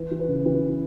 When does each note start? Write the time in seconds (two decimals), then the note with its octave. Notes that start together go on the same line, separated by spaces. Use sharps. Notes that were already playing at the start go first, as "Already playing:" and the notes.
Already playing: E3 B4
0.11 E3
0.20 B4
0.28 C#3
0.45 E3 B4